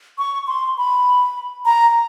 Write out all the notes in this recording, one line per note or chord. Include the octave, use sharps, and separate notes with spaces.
C#6
C6
B5
A#5